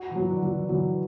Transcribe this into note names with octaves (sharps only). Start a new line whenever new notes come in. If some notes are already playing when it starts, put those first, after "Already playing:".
Already playing: F#4
B2 E3
F#3
D3
F#3
D3
B2 E3 F#3